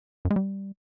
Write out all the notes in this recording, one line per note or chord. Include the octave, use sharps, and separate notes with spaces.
F#2
G#3
G3